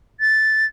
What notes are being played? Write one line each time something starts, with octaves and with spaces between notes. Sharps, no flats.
A6